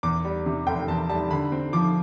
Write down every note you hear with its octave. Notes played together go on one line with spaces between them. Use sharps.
E2 D6
G3
C3
F1 G5
E2 A5
G3 A5
D3 B5
C4
F3 D6